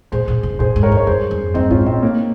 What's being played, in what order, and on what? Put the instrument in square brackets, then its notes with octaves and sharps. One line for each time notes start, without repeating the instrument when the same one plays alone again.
[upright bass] A#2 [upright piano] G#4 C5
[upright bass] A#2
C3
[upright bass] A#2 [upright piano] G#4 C5
[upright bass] G#2
[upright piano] A#4 C#5
[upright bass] F2
[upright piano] C#5
[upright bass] G2 [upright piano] G#4 C5
[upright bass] F2
[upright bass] G2 [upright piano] C4 D#4
[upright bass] G#2 [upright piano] C#4 F4
[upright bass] A#2 [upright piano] C4 D#4
[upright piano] A#3 C#4